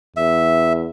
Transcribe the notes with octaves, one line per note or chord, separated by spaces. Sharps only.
E2 E5